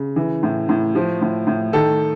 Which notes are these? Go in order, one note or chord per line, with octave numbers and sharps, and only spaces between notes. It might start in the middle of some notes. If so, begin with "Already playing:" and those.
Already playing: C#3
E3
A2
A2
F3
A2
A2
D#3 A4